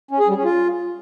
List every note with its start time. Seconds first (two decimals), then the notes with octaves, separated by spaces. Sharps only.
0.11 C#4
0.19 G#4
0.28 G3
0.36 C#4
0.45 F4